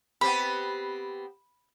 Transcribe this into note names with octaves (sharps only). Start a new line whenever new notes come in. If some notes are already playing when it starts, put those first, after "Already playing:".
B3 C4 G4 B5